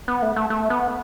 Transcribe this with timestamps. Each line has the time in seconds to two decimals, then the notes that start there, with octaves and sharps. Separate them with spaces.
0.08 B3
0.22 A3
0.36 A3
0.50 A3
0.70 B3